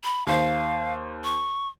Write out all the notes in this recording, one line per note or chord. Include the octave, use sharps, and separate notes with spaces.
B5
D#2 C5 F5
C#6